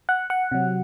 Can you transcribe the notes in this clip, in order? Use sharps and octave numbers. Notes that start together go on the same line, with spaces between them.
F#5
F#5
C3 F#3